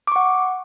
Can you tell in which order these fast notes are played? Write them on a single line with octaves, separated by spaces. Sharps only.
D6 C#6 F#5